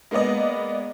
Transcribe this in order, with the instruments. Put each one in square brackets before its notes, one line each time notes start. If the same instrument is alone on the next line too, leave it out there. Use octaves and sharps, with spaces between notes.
[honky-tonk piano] G#3 A#3 B3 D5 D#5